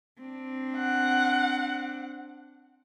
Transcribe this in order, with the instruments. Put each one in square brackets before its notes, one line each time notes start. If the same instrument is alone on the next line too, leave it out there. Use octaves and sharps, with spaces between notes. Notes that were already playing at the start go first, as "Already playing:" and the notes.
[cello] C4 D4
[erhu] F#5